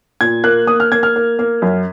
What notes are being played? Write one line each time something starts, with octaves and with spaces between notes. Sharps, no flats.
A#2 G#6
A#3 F#6
A#3 D#6
F6
A#3 G#6
F6
A#3
A#3
F#2